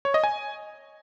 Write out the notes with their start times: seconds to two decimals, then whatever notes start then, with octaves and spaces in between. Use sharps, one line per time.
0.05 C#5
0.14 D#5
0.24 G#5